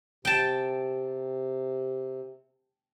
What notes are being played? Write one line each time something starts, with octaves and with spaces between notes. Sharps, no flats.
C3 G5 A5